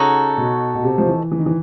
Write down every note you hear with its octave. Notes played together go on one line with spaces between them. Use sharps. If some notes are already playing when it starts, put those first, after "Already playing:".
Already playing: C#3 D#4 F#4 A4 C#5
B2
B2
C3
F3
E3
E3
D#3
E3